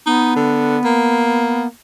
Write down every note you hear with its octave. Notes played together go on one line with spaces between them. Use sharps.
B3 D#4
D3
A#3